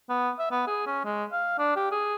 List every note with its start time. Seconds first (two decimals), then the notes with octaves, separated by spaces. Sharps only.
0.09 B3
0.39 E5
0.51 B3
0.67 G#4
0.86 C#4
1.04 G#3
1.32 F5
1.58 D4
1.76 G4
1.91 G#4